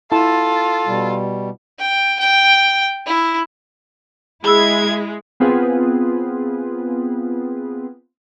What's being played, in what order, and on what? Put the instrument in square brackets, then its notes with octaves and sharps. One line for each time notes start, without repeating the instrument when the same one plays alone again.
[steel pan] E4 A5 [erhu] F4 [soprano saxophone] A4
[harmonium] B2 G3
[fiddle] G5
G5
E4
[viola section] G#3 [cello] E4 [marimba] G#4 B5 E6 [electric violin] G#6
[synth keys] B3 C4 F4 G#4 B4